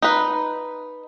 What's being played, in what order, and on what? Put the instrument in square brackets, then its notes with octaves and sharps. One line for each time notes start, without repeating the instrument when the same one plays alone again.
[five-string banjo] D#4 B4